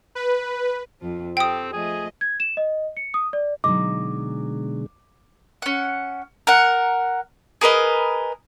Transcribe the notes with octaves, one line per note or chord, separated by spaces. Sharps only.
B4
F2 F3
C4 G4 A4 G5 D#6
F3 A3 G#4 D#5
G#6
E7
D#5
C#7
D#6
D5
B2 D3 F#3 G#3 D#4 D#5 D6
C#4 F#5
A#4 F#5
G#4 A#4 B4 D#5